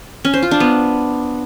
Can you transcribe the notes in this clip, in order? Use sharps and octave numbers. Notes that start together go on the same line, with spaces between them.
C#4
C5
F4
D4
B3